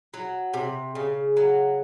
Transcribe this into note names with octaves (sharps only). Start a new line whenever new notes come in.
F#3
C3
C#3
F#3